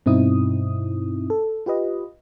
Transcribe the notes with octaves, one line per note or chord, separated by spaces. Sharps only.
G2 B2 C4 D#4 E4 D#6
A4
F4 G4 B4 D#5